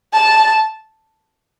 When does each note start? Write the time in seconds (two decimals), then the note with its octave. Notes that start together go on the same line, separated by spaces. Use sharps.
0.13 A5